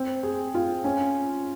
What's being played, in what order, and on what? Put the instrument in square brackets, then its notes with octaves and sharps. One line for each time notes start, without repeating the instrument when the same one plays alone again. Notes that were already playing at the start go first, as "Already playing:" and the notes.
Already playing: [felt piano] C4
G#4
F4
C#4